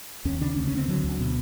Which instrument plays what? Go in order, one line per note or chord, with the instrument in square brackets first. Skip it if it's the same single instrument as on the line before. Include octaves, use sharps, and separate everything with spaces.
[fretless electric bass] D#2 C#4
C#3 D4
D2 C#4
C#4
D2 C4
D3 F#3
D2
B2